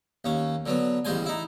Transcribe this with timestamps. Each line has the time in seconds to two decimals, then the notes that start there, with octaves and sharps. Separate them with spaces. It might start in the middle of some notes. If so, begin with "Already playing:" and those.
0.25 D#2 C#4
0.66 D3 F#3 B3
1.05 A1 G3 G#3 C5 G#5
1.26 D#4 E4